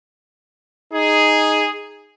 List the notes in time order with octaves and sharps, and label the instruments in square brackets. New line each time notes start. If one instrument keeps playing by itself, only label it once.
[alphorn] D#4 [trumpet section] G#4